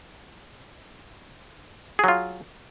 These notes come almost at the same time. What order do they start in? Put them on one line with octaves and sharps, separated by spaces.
G#4 F#3 F4